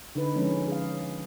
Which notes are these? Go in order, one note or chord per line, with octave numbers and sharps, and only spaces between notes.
D3 D#4 B4
F3 G#3 C#4
G#4 F5